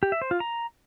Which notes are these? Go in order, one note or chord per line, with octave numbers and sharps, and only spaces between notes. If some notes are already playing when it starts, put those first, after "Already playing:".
G4
E5
C5
F4
A#5